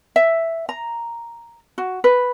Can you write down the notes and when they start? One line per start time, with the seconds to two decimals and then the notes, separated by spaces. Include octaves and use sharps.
0.16 E5
0.69 A#5
1.78 F#4
2.04 B4